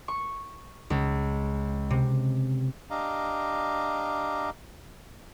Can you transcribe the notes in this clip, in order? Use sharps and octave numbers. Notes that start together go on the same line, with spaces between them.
C#6
C#2
C3
D4 G4 D#5 F5 A#5